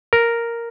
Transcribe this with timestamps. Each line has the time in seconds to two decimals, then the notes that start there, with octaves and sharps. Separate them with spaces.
0.13 A#4